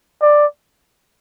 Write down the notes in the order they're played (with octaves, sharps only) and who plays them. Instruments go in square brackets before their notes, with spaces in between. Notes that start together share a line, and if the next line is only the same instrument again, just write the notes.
[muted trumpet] D5